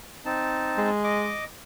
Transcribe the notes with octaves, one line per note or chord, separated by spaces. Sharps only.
C4 D#4 A5
G#3
D#5 D6